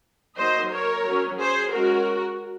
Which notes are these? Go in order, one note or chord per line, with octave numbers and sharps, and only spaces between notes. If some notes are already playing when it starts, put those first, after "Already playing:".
F#3 A#3 D#4 C5 D#5
A#4 C#5
F#3 C#4
G#4 C5
G#3 C#4 F#4 A#4